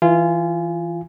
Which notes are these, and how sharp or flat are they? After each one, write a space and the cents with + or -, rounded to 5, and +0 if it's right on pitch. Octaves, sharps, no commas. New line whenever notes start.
E3 +0 F4 -20 G#5 +0